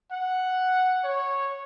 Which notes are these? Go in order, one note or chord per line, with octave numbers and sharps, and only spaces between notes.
F#5
C#5